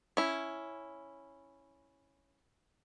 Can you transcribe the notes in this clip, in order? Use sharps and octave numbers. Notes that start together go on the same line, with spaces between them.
C#4 E4